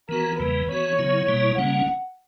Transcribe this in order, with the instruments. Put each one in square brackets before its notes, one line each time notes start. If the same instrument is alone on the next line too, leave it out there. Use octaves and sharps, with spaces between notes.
[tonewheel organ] E3 B3 F#4 [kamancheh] A#4
[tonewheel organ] E2 C#3 E3 G3 A#3 [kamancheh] B4
[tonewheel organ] E3 B3 F#4 [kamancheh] C#5
[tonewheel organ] C#3 F#3 B3 E4
B2 G3 A#3 E4
[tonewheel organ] C#3 G3 A#3 C#4 [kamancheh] F#5